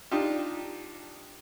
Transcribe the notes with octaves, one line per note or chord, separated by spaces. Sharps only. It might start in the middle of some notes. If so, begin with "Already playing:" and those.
D4 D#4 F4 G4